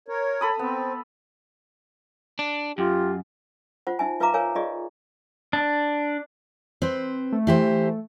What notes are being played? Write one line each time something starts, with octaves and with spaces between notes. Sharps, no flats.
A#4 C#5
A4 B5 D#6
B3 C4
D4
F#2 F4 G4
F4 C5 F#5
D#4 E5 G#5
F4 B4 E5 F5 A#5 D6
A#4 C#5 F5 G#5
F4 G4 G#4 D5 D#5
D4
C4 B4 C5
A3
E3 G4 C5